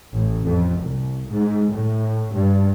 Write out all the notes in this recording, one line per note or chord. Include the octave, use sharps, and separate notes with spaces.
A1
F2
C2
G#2
A2
G2